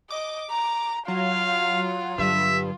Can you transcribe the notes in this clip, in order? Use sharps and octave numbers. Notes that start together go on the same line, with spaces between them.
D#5 D6
A#5
F#3 F4 F5
G2 D3 F#3 E5